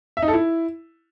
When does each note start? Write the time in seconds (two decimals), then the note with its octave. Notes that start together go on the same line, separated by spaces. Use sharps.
0.17 E5
0.22 D#4
0.28 A4
0.33 E4